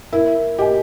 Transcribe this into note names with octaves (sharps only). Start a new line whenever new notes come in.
E4 A#4
G4 D#5 G#5